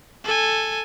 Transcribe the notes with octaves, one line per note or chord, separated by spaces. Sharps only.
A4 G#5